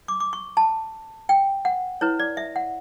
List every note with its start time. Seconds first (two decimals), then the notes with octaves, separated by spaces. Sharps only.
0.08 D6
0.20 D6
0.33 C#6
0.57 A5
1.29 G5
1.65 F#5
2.01 E4 B4 C#5
2.19 D5
2.37 E5
2.56 F#5